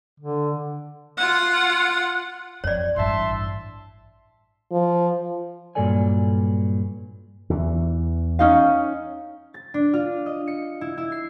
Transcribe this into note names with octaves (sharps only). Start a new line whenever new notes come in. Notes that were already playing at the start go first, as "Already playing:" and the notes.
D3
F4 F#5
F2 C#5 D5
A1 G2 E5 A5 C6
F3
G2 A#2 F#3 A4 D5 G#5
E2 E3
C#4 D#4 F5
A6
D4
F4
D#5
C#7
E4
E4
C7